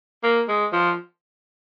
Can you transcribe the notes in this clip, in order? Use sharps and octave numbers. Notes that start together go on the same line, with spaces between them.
A#3
G#3
F3